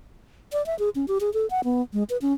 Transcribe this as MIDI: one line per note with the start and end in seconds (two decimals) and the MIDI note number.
0.53 0.65 74
0.66 0.77 76
0.79 0.89 68
0.95 1.06 61
1.08 1.18 67
1.21 1.33 68
1.34 1.49 69
1.50 1.61 78
1.64 1.82 59
1.93 2.03 56
2.10 2.17 71
2.22 2.33 61